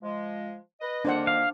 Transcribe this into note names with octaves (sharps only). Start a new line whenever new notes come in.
F3 G#3
B4 D#5
F2 D#3 A#3 D4 C5 F#5
F5